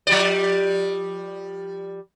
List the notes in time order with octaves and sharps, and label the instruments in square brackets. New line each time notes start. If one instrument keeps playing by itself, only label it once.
[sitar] F3 G3 D5